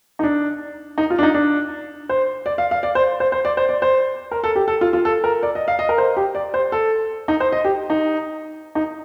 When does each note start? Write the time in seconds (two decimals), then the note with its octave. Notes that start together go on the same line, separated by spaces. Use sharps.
0.19 D#4
0.23 D4
0.98 D#4
1.10 F4
1.19 D4
1.23 D#4
1.34 D4
2.09 C5
2.46 D5
2.58 F5
2.71 F5
2.83 D5
2.95 C5
3.20 C5
3.32 C5
3.45 D5
3.57 C5
3.69 D5
3.82 C5
4.31 A#4
4.44 A4
4.56 G4
4.68 A4
4.81 F4
4.93 F4
5.05 A4
5.24 A#4
5.43 D5
5.55 D#5
5.68 F5
5.79 D#5
5.89 A#4
5.98 C5
6.17 G4
6.35 D5
6.54 C5
6.72 A4
7.28 D#4
7.40 C5
7.52 D#5
7.65 G4
7.90 D#4
8.75 D#4